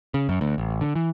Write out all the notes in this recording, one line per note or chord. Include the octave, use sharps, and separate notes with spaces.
C#3
F#2
D2
A1
D3
E3